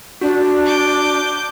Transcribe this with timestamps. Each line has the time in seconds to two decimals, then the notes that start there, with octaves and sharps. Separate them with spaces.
0.21 D4 F#4
0.66 D6 G6